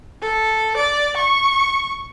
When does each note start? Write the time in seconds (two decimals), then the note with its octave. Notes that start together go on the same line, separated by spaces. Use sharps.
0.21 A4
0.77 D5
1.17 C#6